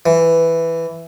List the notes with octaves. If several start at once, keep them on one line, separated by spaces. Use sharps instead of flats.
E3